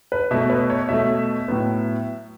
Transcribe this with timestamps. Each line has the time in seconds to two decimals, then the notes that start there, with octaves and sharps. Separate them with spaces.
0.12 B4
0.31 B2 A3 E5
0.50 B4
0.70 C#5
0.89 B2 A3 E5
1.48 A2 F#3 B3